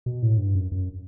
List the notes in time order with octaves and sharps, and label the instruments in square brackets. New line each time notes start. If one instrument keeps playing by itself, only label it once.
[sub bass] B2
A2
G2
F#2
F#2